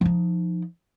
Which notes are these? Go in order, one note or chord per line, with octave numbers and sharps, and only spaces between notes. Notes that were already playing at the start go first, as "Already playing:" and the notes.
F3 D#4